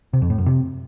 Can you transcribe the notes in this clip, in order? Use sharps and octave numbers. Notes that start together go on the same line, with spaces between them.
C3
F2
A2
F#2
C3